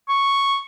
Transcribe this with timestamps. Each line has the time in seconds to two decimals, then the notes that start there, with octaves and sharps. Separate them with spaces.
0.09 C#6